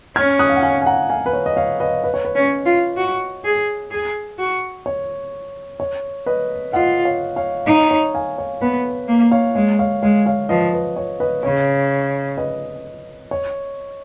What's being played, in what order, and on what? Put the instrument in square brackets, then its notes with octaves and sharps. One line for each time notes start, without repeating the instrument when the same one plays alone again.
[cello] C#4 [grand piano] F6 G#6
[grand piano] D#6 F#6
F5
F#5
F5 G#5
G#5
F#5 A#5
F5 G#5
B4
C#5
D#5
C#5 F5
B4 D#5
B4
C#5
B4
[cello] C#4
F4
F#4
G#4
G#4
F#4
[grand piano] C#5
C#5
B4 D#5
[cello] F4 [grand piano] D#5 F#5
[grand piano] C#5 F5
C#5 F5
[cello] D#4 [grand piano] C#5
[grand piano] C#5
F5 G#5
C#5
[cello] B3 [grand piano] B4
[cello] A#3
[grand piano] C#5 F5
[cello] G#3 [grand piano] C#5
[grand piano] C#5 F5
[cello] G#3 [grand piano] C#5 F5
[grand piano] C#5 F5
[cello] F3 [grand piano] B4 D#5
[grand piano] B4
C#5
B4 D#5
[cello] C#3 [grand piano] C#5
[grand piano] B4 D#5
C#5